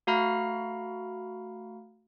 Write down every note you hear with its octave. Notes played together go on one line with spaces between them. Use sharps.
A3 F#4 F5 A#5 B5 F6